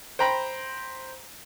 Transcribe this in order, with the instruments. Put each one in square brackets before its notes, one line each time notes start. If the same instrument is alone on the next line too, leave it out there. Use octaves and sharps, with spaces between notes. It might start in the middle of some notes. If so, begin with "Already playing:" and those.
[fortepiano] C5 G5 A#5 B5